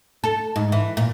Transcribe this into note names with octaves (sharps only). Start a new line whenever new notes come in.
A4
G#2
E3
A#2